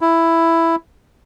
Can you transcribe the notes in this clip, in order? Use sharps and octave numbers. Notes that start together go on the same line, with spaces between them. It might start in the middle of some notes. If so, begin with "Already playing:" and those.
E4